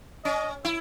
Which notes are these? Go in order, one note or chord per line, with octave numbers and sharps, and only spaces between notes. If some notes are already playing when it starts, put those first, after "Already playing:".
C#4 D#5
E4